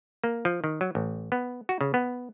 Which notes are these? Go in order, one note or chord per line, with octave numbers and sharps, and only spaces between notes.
A#3
F3
D#3
F#3
A1
B3
F#4
C#3
B3